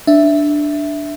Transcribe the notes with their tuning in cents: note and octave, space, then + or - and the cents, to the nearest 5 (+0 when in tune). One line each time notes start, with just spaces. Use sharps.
D4 +5 E5 +0